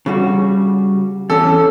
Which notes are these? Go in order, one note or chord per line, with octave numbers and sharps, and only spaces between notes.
C#3 G3 F#4
E2 C#4 A4